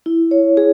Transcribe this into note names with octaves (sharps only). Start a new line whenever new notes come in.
E4
C#5
G#4